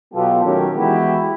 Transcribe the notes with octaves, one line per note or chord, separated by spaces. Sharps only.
B2 F#3 B3 F4 G4 A4
D#3 F#3 A3 C#4 G4 A#4
E3 G#3 B3 E4 F#4 G4